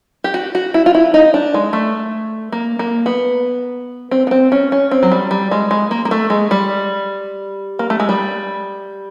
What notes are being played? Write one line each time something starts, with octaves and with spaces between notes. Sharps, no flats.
G4
F#4
F#4
E4
F4
E4
D#4
D4
G#3
A3
A#3
A#3
B3
C4
B3
C4
C#4
C#4
C4
F#3
G3
G3
G#3
G#3
A#3
A#3
A3
G#3
G3
A#3
A3
G#3
G3